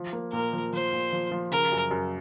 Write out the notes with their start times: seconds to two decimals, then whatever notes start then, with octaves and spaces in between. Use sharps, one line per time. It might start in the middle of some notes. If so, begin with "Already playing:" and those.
Already playing: F3
0.13 A#3
0.32 A#2 A#4
0.53 F3
0.73 F3 C5
0.93 A#2
1.13 F3
1.32 F3
1.51 C#3 A#4
1.72 F#2
1.91 F#2